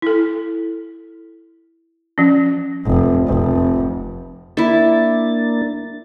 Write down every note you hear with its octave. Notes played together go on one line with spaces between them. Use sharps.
E4 A4
F3 C#4
F1
F1
A#3 D4 E4 E5 A6